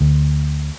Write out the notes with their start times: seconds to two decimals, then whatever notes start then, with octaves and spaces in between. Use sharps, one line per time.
0.01 D2